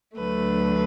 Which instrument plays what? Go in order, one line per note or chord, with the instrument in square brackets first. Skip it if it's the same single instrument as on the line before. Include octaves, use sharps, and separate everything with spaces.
[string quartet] D2 D3 F#3 A3 B4